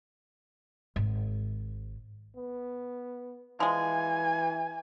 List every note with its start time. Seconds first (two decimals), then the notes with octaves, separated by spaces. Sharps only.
0.96 G#1
2.36 B3
3.60 E3 F3 G#3 G#5